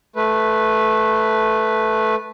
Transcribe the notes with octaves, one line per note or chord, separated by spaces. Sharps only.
A3 B4